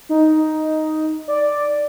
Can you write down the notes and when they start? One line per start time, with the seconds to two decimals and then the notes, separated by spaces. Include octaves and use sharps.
0.09 D#4
1.28 D5